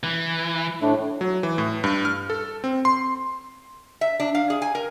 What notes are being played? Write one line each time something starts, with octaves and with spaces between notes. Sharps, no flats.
E3
A2 A3 D4
F#3
E3
A2
G2
F6
A4
C4
C6
E5
D4
F5
G#4
G#5
A#4